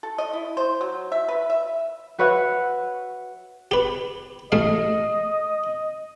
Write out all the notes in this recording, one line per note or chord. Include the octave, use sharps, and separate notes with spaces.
A4
D#5
E4
C5
F#3
E5
B4
E5
F#4 B4 C#5 E5 F#5
G4 B4
A1 A3 D#5 F5